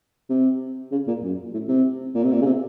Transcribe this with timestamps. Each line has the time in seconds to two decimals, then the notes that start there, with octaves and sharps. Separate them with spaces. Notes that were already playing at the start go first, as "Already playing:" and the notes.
0.30 C3
0.92 C#3
1.07 A#2
1.23 F#2
1.54 A2
1.68 C3
2.15 A#2
2.24 C3
2.32 A#2
2.42 C#3
2.46 C3